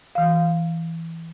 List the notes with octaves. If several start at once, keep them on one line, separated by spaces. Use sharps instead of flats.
E3 F5